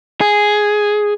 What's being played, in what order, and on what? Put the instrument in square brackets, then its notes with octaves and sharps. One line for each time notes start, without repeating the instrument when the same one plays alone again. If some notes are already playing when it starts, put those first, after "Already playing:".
[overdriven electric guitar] G#4